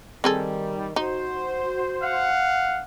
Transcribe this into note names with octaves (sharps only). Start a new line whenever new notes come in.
D#3 G3 C4 G#4 A4
D#4 F#4 C5
F5 F#5